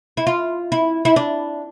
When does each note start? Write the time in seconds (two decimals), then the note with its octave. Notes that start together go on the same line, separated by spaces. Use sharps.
0.17 E4
0.27 F4
0.72 E4
1.05 E4
1.16 D4